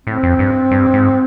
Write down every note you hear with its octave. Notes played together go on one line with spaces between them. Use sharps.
A2 C4
F2
G2
G2
G#2